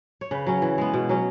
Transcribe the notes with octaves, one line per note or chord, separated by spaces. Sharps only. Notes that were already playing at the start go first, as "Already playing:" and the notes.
C#5
C#3 B4
F#3 C#4
E3
G#3 B3
B2
F#3 C#4